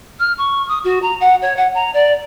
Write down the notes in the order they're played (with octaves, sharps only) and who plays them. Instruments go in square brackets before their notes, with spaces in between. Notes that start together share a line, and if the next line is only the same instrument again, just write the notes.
[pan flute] F6
C#6
D#6
F#4
A#5
F#5
C#5
F#5
A#5
D5